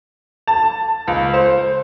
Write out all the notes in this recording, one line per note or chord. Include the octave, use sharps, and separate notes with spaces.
A5
C#2
C5